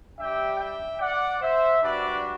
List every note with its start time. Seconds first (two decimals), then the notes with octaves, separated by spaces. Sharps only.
0.18 G3 D4 G4 E5 G5
0.59 E5 G5
1.00 D5 F#5
1.40 C5 E5
1.81 G3 D4 F#4 B4 D5